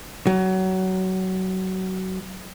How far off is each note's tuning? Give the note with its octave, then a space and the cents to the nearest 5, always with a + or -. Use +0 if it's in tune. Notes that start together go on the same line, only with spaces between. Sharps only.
F#3 +20